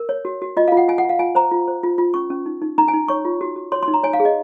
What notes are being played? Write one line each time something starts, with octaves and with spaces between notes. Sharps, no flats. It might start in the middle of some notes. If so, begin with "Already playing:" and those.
Already playing: A#4
C#5
F#4
F#4
F4 D#5
F5
F4
F#5
F4 G#5
F#5
F4
F5
F4 G#5
C5 A#5
F4
C5
F4
F4
C#4 C#6
C#4
D#4
D#4
D#4 A#5
G#5
D#4
C#5 C#6
F4
F#4
F#4
C#5 C6
C6
D#4
A#5
C#5 G#5
F5
G#4
D#5